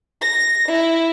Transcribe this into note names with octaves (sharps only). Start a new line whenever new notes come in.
A#6
E4